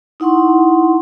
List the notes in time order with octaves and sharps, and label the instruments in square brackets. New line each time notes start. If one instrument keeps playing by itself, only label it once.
[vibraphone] D#4 E4 F#5 C6 C#6